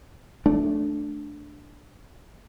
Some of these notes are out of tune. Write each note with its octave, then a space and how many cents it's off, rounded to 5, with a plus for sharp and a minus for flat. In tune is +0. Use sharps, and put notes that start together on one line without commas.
A3 -10 D4 +0